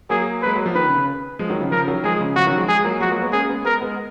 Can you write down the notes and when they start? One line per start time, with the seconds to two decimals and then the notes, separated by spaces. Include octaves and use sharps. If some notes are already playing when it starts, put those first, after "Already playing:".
0.10 F#3 A#3 G#4
0.42 G#3 B4
0.55 F#3
0.66 F3
0.75 D#3 B4
0.86 C#3
0.96 C#3
1.39 F3 G#3
1.50 D#3 F#3
1.60 C#3 F3
1.71 C#3 F3 A#4
1.88 D#3 F#3
2.04 F3 G#3 G#4
2.19 C#3 F3
2.36 C#3 F3 F#4
2.47 D#3 F#3
2.57 F3 G#3
2.68 F3 G#3 G#4
2.85 F#3 A#3
3.00 F3 G#3 F#4
3.11 F#3 A#3
3.22 G#3 B3
3.33 A#3 C#4 G#4
3.49 G#3 B3
3.65 G#3 B3 A#4
3.81 G#3 B3